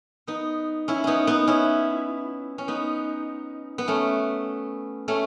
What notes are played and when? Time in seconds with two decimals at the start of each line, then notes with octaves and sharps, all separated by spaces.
0.27 B3 D#4
0.88 C#4 E4
1.04 B3 C#4 D#4
1.27 B3 D#4
1.47 C#4 E4
2.58 C#4
2.68 B3 D#4
3.78 B3
3.88 A3 C#4
5.08 A3 C#4